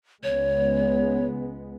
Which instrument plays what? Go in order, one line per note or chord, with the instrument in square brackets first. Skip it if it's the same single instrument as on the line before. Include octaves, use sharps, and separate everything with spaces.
[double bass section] C#2 G#3 B3 [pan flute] C#5